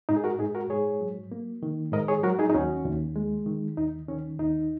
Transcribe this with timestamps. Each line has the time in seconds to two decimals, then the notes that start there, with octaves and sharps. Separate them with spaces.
0.09 G#2 D#4
0.17 G#4
0.24 F#4 A#4
0.39 G#2 D#4 G#4
0.55 F#4 A#4
0.70 G#2 G#4 C#5
1.01 F#3
1.32 A#3
1.63 D#3
1.92 G#2 A#4 D#5
2.08 G#4 C#5
2.23 F#3 F#4 A#4
2.39 D#4 G#4
2.50 D#4
2.54 D#2 C#4 F#4
2.85 D#2
3.16 G#3
3.46 D#3
3.77 D#2 D#4
4.08 D#3 C#4
4.39 D#2 D#4